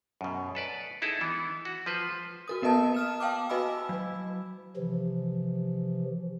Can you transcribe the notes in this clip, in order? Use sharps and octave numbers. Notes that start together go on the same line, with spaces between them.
F#2 B2
A4 B4 D5
D#4 E4 G#4 A4
E3 B3
F#4
F3 B4 C5
F#4 A#4 D#6
A#3 B3 B4 D#5 A5
D#6 F6 E7
F5 G5 A5 D6
F#4 B4 D#5 G#5 B5 E6
F#3
C3 E3 F3